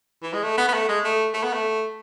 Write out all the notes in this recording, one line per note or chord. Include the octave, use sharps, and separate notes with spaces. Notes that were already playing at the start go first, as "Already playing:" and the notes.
E3
G#3
A3
B3
B3
A3
G#3
A3
A3
B3
A3